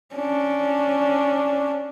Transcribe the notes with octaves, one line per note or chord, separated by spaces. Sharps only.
C#4 D4